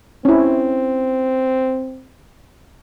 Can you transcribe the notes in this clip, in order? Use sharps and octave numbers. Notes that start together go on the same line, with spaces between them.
C4 C#4 E4